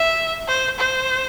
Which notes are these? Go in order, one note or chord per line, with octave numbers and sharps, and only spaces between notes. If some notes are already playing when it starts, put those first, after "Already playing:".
Already playing: E5
C5
C5